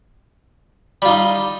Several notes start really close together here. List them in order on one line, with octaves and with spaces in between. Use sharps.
G3 F4 D#4